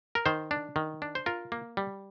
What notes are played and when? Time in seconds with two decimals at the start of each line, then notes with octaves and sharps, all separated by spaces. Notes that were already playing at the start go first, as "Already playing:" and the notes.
0.15 A#4
0.26 D#3 C5
0.51 D4
0.76 D#3
1.02 D4
1.15 C5
1.26 F4 A#4
1.52 A#3
1.77 G3